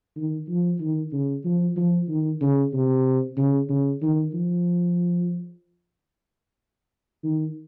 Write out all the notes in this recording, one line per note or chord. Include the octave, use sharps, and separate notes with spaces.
D#3
F3
D#3
C#3
F3
F3
D#3
C#3
C3
C#3
C#3
D#3
F3
D#3